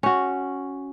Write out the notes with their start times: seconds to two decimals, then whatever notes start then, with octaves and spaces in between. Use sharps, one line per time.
0.03 C#4 F#4